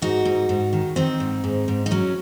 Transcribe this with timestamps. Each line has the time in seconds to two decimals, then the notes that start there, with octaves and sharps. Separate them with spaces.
0.02 G#2 D#4 F#4
0.25 G#2
0.49 G#2
0.73 D#3
0.96 D#3 C4 D#4
1.20 G#2
1.44 G#2
1.68 G#2
1.86 D#4
1.91 F#3 C#4